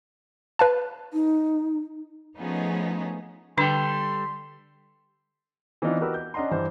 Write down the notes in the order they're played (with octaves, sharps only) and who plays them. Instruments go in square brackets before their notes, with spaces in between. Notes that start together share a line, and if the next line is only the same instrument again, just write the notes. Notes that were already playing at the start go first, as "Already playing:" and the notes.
[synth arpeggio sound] B4 F5 A5
[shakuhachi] D#4
[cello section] F3 A3 B3 C#4 D#4 G#4
[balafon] D3 D4 [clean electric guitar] G3 A4 G5 [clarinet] C6
[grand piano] E3 B3 C4 D4 D#4 F4
F#4 G4 A#4 B4 D#5 E6
G6
C#4 D4 D#5 F#5 A#5 C6
G2 E3 G3 C5